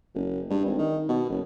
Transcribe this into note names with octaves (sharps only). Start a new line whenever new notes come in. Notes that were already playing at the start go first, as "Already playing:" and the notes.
F#1
G2
G#1
D#3
B2
F#1